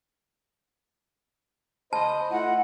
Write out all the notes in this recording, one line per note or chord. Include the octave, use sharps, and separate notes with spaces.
C5 D#5 A5 B5
A3 E4 F4 D#5 F#5